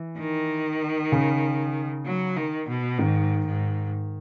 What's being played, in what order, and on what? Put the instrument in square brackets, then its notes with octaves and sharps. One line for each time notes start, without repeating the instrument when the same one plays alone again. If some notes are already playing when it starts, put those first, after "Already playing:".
Already playing: [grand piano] E3
[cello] D#3
[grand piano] C#3
[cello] F#3
D#3
B2
[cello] G#2 [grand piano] D#3
[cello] G#2